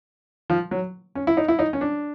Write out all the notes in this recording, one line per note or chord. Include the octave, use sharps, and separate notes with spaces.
F3
F#3
C#4
E4
D#4
E4
D#4
C#4
D4